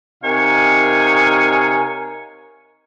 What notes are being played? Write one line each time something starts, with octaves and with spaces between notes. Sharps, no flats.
C3 D#4 A#4 C#5 F5 G#5